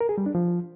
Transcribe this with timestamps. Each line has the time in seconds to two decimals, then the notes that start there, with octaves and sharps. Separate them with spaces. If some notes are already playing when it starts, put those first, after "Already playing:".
0.01 A#4
0.09 G#4
0.18 G3
0.26 D4
0.35 F3